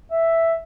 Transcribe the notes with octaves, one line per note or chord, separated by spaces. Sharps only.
E5